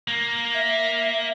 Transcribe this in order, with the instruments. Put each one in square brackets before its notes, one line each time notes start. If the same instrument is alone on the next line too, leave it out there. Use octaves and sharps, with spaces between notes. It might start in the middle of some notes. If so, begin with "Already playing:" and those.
[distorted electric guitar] A#3
[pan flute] E5